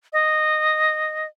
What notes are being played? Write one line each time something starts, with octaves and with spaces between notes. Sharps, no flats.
D#5